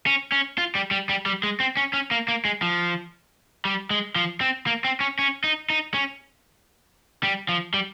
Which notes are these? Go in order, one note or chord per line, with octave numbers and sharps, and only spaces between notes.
C#4
C#4
F4
G3
G3
G3
G3
G#3
C4
C#4
C#4
A#3
A#3
G#3
F3
G3
G#3
F3
C4
A#3
C4
C#4
C#4
D#4
D#4
C#4
G3
F3
G3